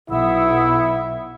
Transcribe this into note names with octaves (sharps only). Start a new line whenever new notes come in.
B1 E4 E5 F#5 D#6 E6